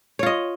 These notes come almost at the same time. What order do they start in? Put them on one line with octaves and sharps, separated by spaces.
C#5 F4 D#5